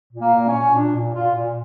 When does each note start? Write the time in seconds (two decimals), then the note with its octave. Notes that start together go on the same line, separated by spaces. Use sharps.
0.13 A#2
0.20 A#3
0.33 A#2
0.47 C#4
0.53 A#2
0.74 A#2 D4
0.94 A#2
1.14 A#2 F4
1.34 A#2